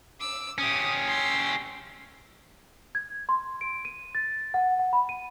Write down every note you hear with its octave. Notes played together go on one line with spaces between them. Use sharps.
D6 E6
C#4 G4 D#6
C6 E6
G#6
C6
D7
D#7
A6
F#5
F#5
B5
D#7